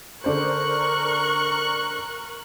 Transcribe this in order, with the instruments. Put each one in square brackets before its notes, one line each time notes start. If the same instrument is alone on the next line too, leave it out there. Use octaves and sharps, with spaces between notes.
[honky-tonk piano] D3 D4 C5 [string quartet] A#4 C#6 F#6